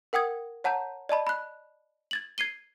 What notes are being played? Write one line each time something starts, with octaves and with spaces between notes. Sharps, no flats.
A#4 F#5 G5 D#6 G#6
C#5 F#5 A5 A#5 G6
D5 D#5 A5 B5
B5 F#6
G#6 A6 F#7
G#6 C7 D#7 G7